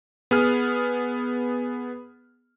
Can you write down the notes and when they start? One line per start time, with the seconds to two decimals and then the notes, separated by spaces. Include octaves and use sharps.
0.31 B3 G#4 F6